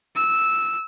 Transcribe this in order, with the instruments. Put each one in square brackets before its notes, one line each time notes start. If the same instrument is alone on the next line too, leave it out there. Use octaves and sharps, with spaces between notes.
[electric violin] E6